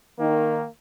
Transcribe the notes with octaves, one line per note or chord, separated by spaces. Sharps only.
D#3 A#3